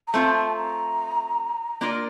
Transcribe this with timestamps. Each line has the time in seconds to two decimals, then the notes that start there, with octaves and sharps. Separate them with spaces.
0.08 A#5
0.14 A3 C4 F4 A5
0.35 A5
0.56 A#5
1.81 A#3 D4 F4 A#4 D5